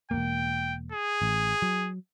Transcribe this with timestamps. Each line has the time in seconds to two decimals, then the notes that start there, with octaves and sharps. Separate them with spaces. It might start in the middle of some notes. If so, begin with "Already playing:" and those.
0.11 E1 F#2 A#3 G5
0.92 G#4
1.22 A1
1.62 F#3